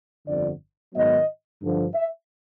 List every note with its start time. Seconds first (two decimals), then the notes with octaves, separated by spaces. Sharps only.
0.26 G1 F2 D3 D5
0.94 G#2 D#3 F#3 B3 D#5
1.62 G2 D3 F3
1.95 E5